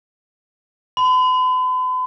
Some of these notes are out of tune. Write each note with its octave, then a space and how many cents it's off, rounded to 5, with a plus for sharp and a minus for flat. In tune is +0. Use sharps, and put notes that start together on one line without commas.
B5 +45